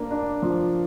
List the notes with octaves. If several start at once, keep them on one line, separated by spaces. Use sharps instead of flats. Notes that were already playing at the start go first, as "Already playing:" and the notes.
Already playing: A#3 D4
D4
F3